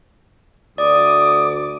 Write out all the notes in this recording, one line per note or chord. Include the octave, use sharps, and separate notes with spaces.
D2 D5 D6 D#6